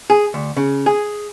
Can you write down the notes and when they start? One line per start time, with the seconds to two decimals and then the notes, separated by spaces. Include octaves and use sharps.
0.10 G#4
0.34 D2
0.57 C#3
0.86 G#4